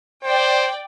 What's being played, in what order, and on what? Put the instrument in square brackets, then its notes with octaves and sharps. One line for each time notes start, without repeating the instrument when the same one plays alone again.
[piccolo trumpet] C5 [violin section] D5 G5